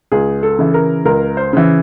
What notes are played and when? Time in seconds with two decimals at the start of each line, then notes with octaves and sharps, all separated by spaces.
0.12 C#2 G#4
0.43 A4
0.59 C#3 E3
0.74 A#4
1.05 C#2 A#4
1.37 C5
1.53 C#3 E3